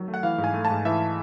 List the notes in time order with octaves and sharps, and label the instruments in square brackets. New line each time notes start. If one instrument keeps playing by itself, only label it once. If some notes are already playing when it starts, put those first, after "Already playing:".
Already playing: [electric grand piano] D#3 F#3
A3
F#5
E3 F5
G#2
G#5
A3
A5
G#2
E3 E5